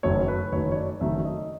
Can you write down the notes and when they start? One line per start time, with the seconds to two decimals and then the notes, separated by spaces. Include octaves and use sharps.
0.03 F#1 F#2 D#3 F#3 A3 C#5
0.28 B4
0.52 F#1 F#2 D#3 F#3 A3 C#5
0.72 C#5
0.76 D5
1.01 F#1 F#2 D#3 F#3 A3 E5
1.25 D#5